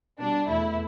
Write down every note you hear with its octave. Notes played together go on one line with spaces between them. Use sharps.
B2 G3 D4
E2 B2 A3 E4